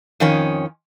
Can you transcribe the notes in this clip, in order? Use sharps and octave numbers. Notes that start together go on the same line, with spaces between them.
F2 D#3 C#4